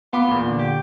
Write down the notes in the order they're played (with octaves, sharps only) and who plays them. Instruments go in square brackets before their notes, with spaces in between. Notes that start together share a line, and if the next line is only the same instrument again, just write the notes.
[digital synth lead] B3 [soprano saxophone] F4 [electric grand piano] F#5 B5 D6
[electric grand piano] E2 A#2
[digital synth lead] D3
[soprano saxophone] G4